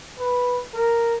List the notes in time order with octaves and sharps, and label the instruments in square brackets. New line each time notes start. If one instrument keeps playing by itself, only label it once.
[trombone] B4
A#4